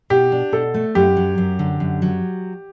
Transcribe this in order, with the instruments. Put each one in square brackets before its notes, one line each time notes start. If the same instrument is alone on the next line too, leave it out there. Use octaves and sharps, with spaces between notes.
[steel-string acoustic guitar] B2 [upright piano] G4
[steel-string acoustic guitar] D4
[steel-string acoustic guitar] B2 [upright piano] A4
[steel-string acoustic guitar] A3
[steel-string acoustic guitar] F#2 [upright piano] G4
[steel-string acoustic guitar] F#3
F#2
D3
F#2
F#3